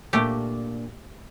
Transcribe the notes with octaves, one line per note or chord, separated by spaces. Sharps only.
A#2 A3 A#3 D4 G4